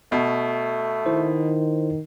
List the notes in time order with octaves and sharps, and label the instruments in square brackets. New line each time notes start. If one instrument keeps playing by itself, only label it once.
[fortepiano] B2 [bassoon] A3
[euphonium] D#3 [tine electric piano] E4 C5